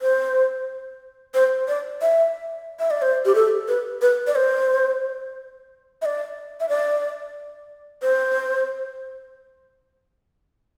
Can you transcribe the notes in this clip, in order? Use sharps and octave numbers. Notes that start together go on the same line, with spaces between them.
C5
C5
D5
E5
E5
D5
C5
G4
A4
B4
B4
D5
C5
E5
D5
E5
D5
C5